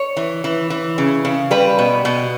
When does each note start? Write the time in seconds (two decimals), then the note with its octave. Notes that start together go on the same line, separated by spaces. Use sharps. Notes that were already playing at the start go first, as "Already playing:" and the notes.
Already playing: C#5
0.17 E3
0.44 E3
0.70 E3
0.98 C#3
1.25 C#3
1.51 G3 B4
1.79 B2
2.05 B2